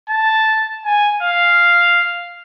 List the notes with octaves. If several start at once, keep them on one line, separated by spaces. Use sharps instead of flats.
A5
G#5
F5